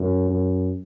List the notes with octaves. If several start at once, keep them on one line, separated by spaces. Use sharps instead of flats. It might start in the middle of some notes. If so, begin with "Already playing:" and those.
Already playing: F#2
F#2